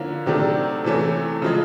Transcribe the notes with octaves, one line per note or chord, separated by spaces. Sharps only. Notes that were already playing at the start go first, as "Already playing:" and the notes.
Already playing: D3 F3 A#3 C#4 E4
C3 D#3 F#3 A3 D4
C3 E3 A3 C#4
C#3 F3 G#3